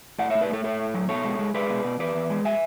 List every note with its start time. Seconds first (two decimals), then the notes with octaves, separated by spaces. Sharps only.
0.19 A2 D5 F#5
0.30 A3 C#5 E5
0.41 B4 D5
0.49 A3 A4 C#5
0.64 A2 A4 C#5
0.80 A2
0.94 F#3
1.09 B2 A4 C#5
1.24 G#3
1.39 G#3
1.54 G#3 B4 D5
1.70 B2
1.84 B2
1.99 E2 B4 D5
2.15 E2
2.30 G#3
2.45 E5 G#5